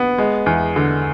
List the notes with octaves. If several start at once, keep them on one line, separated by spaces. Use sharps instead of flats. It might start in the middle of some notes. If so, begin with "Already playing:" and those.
Already playing: B3
G#3
E2
D3